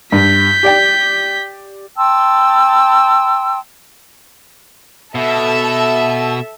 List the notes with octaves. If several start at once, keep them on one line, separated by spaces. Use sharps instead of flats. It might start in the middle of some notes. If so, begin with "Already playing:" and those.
G2 G6 B6
G4 D5 G5
G5 A5 C6 E6
B2 A4 E5